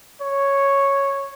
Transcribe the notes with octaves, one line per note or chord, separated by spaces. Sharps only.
C#5